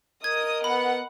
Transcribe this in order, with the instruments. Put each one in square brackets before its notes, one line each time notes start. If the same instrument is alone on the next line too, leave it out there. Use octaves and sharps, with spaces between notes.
[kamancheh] A#4 D#5 [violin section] D#6 [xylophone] G#6
[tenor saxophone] B3 [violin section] F#5 [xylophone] B5